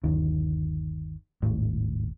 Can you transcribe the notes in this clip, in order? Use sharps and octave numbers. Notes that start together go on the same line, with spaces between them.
G1 D#2 D#3
D#1 G#1 A2